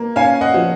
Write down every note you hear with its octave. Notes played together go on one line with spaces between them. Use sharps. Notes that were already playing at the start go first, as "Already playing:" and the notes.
Already playing: A#3
C#4 F5 G#5
D#5 F#5
F3